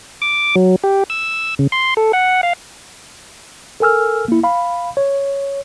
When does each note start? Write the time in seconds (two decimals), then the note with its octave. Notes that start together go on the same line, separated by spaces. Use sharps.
0.22 D6
0.56 F#3
0.84 G4
1.10 E6
1.59 C#3
1.72 C6
1.97 A4
2.13 F#5
2.43 F5
3.80 A4 A#4 G#5 E6 F6
4.28 A#3 E4
4.44 F5 B5
4.97 C#5